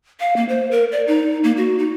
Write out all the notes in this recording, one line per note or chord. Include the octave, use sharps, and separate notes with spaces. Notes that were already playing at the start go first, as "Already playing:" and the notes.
F5
A#3
C5
A#4
D5
D#4
A#3
F#4
D#4